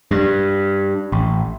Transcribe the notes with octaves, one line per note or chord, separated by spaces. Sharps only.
G2
A1